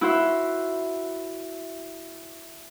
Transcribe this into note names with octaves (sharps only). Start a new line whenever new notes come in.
E4 F#4 C5 E5